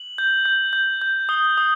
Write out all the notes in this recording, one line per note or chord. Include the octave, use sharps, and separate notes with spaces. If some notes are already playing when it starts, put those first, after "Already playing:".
Already playing: F#7
G6
G6
G6
G6
D#6 G7
D#6